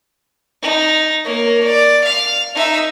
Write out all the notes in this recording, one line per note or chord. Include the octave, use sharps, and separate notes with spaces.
D#4
A#3 C#5
D5
F5
D#4 E5